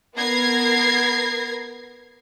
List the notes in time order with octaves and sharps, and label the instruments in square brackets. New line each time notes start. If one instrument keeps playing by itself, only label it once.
[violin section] B3 A#4 G#6 A#6 C7